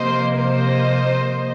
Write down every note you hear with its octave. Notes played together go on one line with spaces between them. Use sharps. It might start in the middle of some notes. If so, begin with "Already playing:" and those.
Already playing: C3 F3 A#3 C5 D#5
C5 D#5